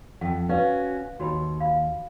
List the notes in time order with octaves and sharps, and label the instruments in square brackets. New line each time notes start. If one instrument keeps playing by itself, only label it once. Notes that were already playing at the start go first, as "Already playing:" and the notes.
[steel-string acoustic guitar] F2 [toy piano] F#5 G5
[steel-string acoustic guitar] C#4 F#4 [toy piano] B4 D5 F5
[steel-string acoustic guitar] D#2 [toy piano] F#4 C#5 B5
[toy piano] F5 B5